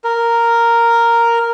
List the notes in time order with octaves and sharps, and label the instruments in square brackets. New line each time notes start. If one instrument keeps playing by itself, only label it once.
[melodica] A#4